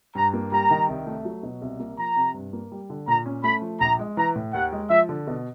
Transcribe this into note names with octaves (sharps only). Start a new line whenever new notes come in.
G2 A#5
A#3
G3 A#5
D#3
C2
A3
F#3
B2
C2
A#3
F3 A#5
C3
G2
A#3
G3
D3
A#2 A#5
C#4
A3 B5
F3
A#1 A#5
G#3
E3 A#5
A2
D#2 F#5
G#3
F3 E5
D3
B2